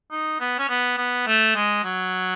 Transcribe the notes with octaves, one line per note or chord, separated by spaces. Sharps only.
D#4
B3
C#4
B3
B3
A3
G#3
F#3